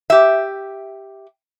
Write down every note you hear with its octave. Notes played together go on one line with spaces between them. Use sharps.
G4 E5